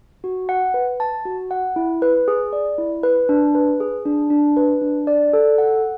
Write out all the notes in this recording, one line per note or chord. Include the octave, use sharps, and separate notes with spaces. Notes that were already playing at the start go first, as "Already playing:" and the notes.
F#4
F#5
B4
A5
F#4
F#5
E4
B4
G#4
D5
E4
B4
D4
B4
G#4
D4
D4
B4
D4
D5
A4
F#5